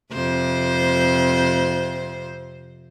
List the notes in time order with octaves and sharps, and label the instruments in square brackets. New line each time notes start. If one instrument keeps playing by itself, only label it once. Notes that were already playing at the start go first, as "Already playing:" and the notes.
[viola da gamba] F2 C3 C5